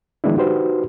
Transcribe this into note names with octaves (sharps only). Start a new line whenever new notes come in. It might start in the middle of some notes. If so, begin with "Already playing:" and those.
D#3 F3 G#3 B3 D4 E4
D#4 F#4 G4 B4 C5